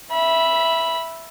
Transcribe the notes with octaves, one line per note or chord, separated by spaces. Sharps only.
E5 B5